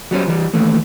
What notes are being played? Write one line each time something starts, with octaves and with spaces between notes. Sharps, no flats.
F#3 G3 C#4 C5
E3 G3
D#2 E3 A3